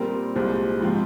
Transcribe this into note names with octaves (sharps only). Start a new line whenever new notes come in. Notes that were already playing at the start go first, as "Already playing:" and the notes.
Already playing: A#2 G3 C4 A#4
C2 A#2 G#3 C5
G#2 F3 C4